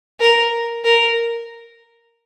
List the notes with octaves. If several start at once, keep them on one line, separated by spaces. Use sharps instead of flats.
A#4
A#4